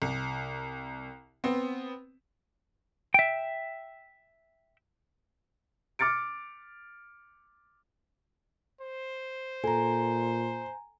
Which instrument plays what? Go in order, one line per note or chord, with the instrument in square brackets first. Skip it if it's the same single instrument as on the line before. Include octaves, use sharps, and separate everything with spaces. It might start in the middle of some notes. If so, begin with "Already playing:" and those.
[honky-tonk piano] C2
B3 C4
[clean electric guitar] E5 G5
[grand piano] D6 F6 A6 C#7 D7
[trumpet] C5
[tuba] A#2 [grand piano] A4 [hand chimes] G#5 A#5